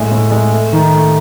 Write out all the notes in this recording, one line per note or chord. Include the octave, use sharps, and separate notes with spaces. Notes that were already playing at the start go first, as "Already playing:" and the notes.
Already playing: A2 G#3 E5
A2
G#3
A3
D#3
A3